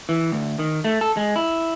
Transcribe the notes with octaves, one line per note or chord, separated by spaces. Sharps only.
E3
D2
D#3
A3
A4
G#3
E4